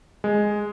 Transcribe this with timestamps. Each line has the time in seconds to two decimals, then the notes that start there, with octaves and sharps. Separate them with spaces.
0.24 G#3